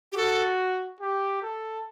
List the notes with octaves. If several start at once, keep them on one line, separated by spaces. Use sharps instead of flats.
G4
F#4 A4
G4
A4